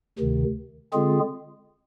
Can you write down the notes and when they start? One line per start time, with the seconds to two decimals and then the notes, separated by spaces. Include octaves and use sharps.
0.19 D2 C3 D#3
0.93 D3 G#3 C4 F4 G#4